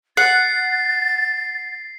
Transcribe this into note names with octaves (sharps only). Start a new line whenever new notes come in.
F#5 A6 C7